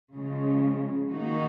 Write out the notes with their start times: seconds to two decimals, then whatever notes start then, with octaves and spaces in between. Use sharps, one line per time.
0.15 C#3 F3 G#3
1.09 D#3 A#3 D#4 F#4